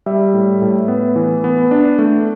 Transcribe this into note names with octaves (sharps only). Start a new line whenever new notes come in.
G3 E5
A2
A2
B3
E3
B3
D4
A3